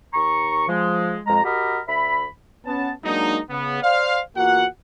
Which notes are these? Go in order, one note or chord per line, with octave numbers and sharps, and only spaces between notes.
D#2 A#5 C#6
F3 G#3
F2 G#3 A#5
F#4 G4 A#4 D#5 B5
D2 E5 B5
B3 C#4 A5
F#3 G#3 A#3 D4 D#4
C#3 B3
C5 D5 F5
E2 A#3 F4 F#4 F#5